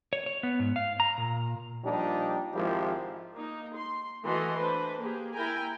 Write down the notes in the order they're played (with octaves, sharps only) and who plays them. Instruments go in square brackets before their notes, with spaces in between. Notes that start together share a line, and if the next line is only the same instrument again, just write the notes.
[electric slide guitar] C#5
C#5
B3
G#2
F5
A#5
A#2
[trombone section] A#2 F3 G3 D4 D#4 G4
G#1 F3 G#3 E4 G4 A#4
[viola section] A#3 D#4
C6
E3 A3 F#4 A4 D#5 C6
D4 B4 C5
A#3 G4 G#4
E4 A#4 G5 G#5 A#5